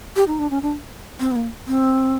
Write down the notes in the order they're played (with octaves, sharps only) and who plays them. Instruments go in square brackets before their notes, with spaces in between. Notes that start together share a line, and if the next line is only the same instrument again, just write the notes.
[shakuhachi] G4
D#4
D4
C#4
D4
C4
B3
A#3
C4